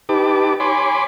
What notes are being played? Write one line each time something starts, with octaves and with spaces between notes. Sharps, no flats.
D#4 G4 B4 A5 D6
C#5 G#5 B5 C6 D6